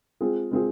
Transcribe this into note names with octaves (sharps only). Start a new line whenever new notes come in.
G#3 C4 F4 G#4
G#3 C4 F4 G#4